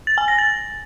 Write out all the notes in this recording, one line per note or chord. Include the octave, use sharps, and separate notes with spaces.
A6
G#5
A#6
A6